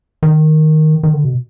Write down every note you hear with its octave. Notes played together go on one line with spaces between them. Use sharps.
D#3
D#3
D3
B2